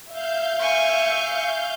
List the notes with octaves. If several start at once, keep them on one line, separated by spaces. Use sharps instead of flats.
E5 F5 G6
G#5 C#6